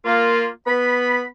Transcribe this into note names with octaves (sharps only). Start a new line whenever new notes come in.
A#3 F4
B3 B5